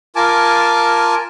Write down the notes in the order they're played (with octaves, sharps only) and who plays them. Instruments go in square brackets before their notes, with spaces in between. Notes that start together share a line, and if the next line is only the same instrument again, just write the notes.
[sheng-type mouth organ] F4 A#4 G#5 A5 D6